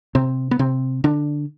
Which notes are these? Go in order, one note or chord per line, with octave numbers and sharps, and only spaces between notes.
C3 C4
B3
C3 C4
D3 D4